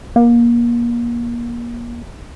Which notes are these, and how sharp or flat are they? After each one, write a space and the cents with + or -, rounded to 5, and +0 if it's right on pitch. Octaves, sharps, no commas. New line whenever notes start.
A#3 +30